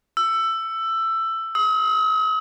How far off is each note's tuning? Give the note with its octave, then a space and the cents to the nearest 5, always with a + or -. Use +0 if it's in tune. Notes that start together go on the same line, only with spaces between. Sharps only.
E6 +15
D#6 +45